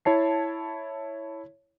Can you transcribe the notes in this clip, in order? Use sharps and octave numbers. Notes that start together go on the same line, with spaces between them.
E4 C#5 A5 C7